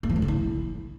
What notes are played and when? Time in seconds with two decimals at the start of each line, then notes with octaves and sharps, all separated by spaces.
0.03 A#3
0.10 E3
0.16 A3
0.22 C#3
0.28 E4